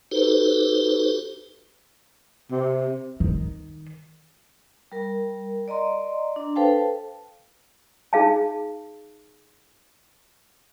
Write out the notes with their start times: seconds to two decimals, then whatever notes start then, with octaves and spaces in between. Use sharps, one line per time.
0.11 D#4 F#4 G4 A4 B4 C5
2.51 C3
3.20 D#3
4.92 G3 A#4
5.68 D5 D#5 A#5 C6
6.36 D4
6.56 A4 B4 C5 F5 G5 A5
8.13 D#4 G#4 F5 A5